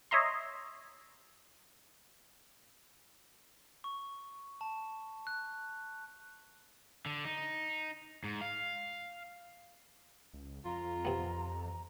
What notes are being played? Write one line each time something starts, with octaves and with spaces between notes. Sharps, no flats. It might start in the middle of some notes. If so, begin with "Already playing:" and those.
C#5 D#5 E5 A#5 C6
C#6
A5
F#6
D3
D#4
G#2
F5
C#2
F2 F4 A#5
C3 B3